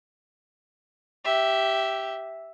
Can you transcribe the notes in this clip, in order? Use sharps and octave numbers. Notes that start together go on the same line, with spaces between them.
G4 E5